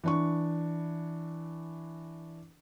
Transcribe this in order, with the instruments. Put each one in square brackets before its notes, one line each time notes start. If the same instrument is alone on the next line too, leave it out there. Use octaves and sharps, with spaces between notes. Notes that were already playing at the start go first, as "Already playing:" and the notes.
[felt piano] E3 D4 C#6